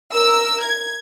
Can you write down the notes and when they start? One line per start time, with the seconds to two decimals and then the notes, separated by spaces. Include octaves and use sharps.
0.13 A#4 E6
0.63 G#6